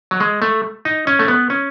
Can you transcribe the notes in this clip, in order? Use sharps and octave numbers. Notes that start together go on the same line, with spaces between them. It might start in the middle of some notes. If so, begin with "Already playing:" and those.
F#3
G#3
A3
D#4
C#4
A3
B3
C#4